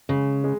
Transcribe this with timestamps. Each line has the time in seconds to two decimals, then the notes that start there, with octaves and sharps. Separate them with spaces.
0.09 C#3 G#3
0.44 G#3